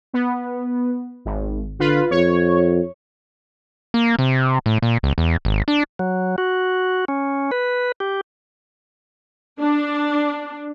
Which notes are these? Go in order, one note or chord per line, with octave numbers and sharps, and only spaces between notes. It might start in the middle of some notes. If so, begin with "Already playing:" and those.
B3
G#1
D3 F4 B4
F2 C#5
A#3
C3
A2
A#2
C#2
E2
G#1
D4
F#3
F#4
C#4
B4
G4
D4